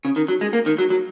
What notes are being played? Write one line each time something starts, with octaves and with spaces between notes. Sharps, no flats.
C#3
D#3
F#3
G#3
A#3
D#3
F#3
F#3